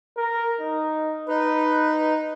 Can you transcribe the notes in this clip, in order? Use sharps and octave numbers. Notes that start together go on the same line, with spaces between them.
A#4
D#4
D#4 B4